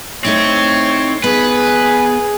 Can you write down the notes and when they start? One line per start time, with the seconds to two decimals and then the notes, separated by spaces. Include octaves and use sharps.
0.25 A3 C4 D#4 E4 C#5
1.24 B3 G#4 B4